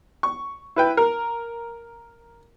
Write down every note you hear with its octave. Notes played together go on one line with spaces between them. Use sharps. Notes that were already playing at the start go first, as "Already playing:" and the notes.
C#6
E4 B4 G5
A#4